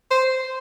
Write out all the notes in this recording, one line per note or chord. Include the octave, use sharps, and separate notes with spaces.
C5